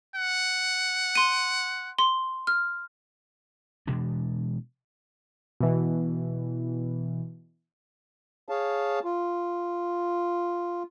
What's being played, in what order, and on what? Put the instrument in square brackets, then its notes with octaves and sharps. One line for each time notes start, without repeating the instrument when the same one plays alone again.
[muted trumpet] F#5
[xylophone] C6 D#7
C6
F6
[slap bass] B2 E3 G#3 D4
[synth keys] B2 E3
[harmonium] G#4 C#5 F5 A5
F4